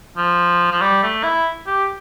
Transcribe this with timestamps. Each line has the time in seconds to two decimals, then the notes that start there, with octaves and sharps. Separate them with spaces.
0.17 F3
0.71 F3
0.81 G3
1.03 A3
1.24 E4
1.67 G4